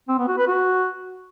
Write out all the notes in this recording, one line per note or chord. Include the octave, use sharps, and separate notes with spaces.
C4
B3
F#4
B4
F#4